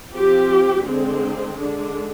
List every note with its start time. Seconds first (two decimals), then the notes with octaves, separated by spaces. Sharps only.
0.13 F3 C4 G4
0.83 D3 G#3 C4
1.54 D3 G#3 D4